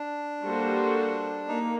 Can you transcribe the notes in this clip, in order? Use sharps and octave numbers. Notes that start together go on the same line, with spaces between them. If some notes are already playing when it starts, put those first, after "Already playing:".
Already playing: D4
G3 A#3 F#4 A4 C5
A#3 D#4